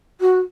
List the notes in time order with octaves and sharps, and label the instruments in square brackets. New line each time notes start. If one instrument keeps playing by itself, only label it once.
[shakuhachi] F#4